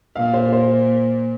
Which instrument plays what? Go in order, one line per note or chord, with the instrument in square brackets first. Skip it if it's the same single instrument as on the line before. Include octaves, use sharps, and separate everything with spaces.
[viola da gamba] A#2 [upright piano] F5
[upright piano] C5
C5